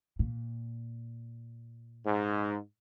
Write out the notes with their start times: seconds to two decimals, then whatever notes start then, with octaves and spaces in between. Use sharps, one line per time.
0.19 A#2
2.05 G#2